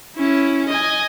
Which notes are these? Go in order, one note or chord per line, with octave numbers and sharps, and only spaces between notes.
C#4 E4
D#5 G#5